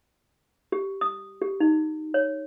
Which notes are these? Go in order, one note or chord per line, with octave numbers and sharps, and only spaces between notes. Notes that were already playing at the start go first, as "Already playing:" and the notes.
G4
D#6
G4
D#4
C#5